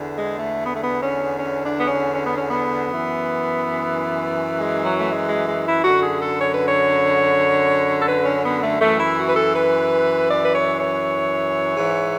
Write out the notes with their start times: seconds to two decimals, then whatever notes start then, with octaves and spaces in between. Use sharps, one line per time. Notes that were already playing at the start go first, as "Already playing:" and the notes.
Already playing: E2 D3
0.15 G#3
0.39 A3
0.64 B3
0.75 A3
0.83 B3
1.02 C#4
1.38 C#4
1.63 D4
1.79 B3
1.88 C#4
2.13 C#4
2.25 B3
2.36 C#4
2.50 B3
2.87 F#2 E3
4.59 G#3
4.84 F#3
4.99 A3
5.10 G#3
5.28 G#3
5.47 G#3
5.65 E4
5.83 F#2 D3 F#4
6.02 G#4
6.21 A4
6.39 C#5
6.53 B4
6.66 C#5
8.00 A4
8.07 B4
8.25 C#4
8.44 B3
8.62 A3
8.80 F#2 E3 A3
8.99 E4
9.17 F#4
9.28 B4
9.37 A4
9.55 B4
10.29 D5
10.44 B4
10.54 C#5
10.79 C#5
11.77 G#2 E3